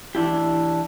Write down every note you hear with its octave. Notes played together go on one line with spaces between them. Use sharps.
E3 D4 E4 G4